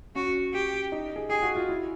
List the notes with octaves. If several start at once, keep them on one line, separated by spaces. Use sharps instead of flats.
C#4 F#4
G4
D#4
G#4
G4 G#4
F#4
F4
E4